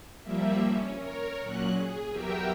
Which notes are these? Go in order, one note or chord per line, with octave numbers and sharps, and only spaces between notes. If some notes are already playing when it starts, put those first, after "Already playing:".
F3 G3 A#3 E5
C#4
A#4 C#5
A#2 F#3 C#4 F#6
G#4
E2 F#3 G4 A#4 E5 G5